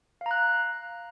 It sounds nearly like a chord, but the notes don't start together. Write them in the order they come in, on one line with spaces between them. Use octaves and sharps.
F5 A#5 F#6